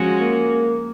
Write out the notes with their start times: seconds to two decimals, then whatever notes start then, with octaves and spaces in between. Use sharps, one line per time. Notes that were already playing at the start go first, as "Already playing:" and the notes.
Already playing: F3 G#3 C#4 F#4
0.21 A#3